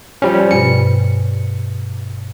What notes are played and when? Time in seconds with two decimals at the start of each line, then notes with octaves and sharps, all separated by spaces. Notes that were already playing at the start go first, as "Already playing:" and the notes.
0.22 F3 G3 C#4 C5 D5
0.51 G2 B2 C#7